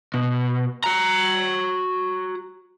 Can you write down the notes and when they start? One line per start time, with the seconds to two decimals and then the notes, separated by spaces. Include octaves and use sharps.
0.14 B2
0.84 F#4 A#5